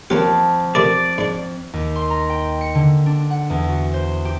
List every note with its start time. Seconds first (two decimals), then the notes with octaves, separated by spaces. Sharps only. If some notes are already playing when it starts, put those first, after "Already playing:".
0.10 F2 A#3 C#4 F4 G4 A5
0.75 C3 A3 A#4 D5
1.18 G#2 D4
1.73 D#2
1.95 C6
2.10 A#5
2.30 G5
2.61 C#7
2.75 D3
3.06 D4
3.30 F#5
3.50 E2
3.69 F#4
3.94 C5
4.25 G4